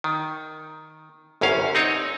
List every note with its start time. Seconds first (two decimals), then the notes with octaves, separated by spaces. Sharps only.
0.04 D#3
1.41 G1 C2 F#2 C#4 F5
1.75 C4 D#4 C#5